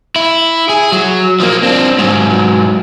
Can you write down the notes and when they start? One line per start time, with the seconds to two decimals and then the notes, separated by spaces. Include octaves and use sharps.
0.16 E4
0.69 G#4
0.92 F#3
1.40 F3 A#3
1.63 C4 D4
1.99 G#2 F#3